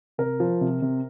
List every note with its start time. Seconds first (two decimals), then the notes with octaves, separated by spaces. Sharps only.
0.18 C3 A#4
0.40 F3
0.61 C3
0.82 C3